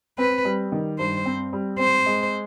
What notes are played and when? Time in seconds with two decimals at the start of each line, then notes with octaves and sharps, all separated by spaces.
0.18 C4 B4
0.45 G3
0.72 D#3
0.99 G2 C5
1.26 C4
1.53 G3
1.79 C4 C5
2.06 G#3